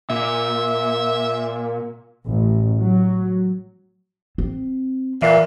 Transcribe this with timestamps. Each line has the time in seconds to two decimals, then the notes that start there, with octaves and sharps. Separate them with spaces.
0.10 A#2 E5
2.26 A1
2.79 F#3
4.38 C4
5.22 A#2 E3 E5